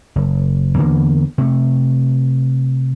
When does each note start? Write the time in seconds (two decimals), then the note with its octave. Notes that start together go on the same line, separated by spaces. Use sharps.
0.16 F#1
0.78 E2 D3 E3 A#3
1.38 C3 A3